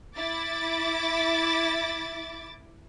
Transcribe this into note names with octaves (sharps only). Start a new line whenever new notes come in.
E4 D6 A6